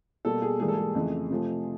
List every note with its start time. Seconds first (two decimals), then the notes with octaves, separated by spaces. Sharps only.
0.25 B2 G3 A#3 A4
0.42 G#4
0.60 G#2 E3 G3 A#3 G#4
0.68 A4
0.77 G#4
0.95 F2 C#3 E3 A3
1.30 C3 F3 A3